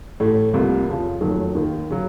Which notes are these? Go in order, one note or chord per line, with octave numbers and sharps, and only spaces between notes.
A1 A2 A3
C2 C3 F3 A#3
F2 C#3 F3
F#1 F2 D#3 F#3 A3
D#2 D#3 A#3
C#3 F#3